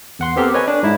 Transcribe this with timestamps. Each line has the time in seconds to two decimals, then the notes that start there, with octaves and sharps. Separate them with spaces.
0.19 E2 F#5 C6
0.36 B3 C4 G4 A4 A#4
0.54 B4 C#5 D#5 G#5
0.68 D4
0.83 G#2 D#4 E4